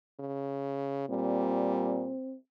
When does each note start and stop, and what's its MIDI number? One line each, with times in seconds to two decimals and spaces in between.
0.20 1.09 49
1.10 2.11 46
1.10 2.14 55
1.10 2.35 60